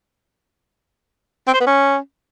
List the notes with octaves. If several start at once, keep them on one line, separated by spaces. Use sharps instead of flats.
C4
C5
B3
C#4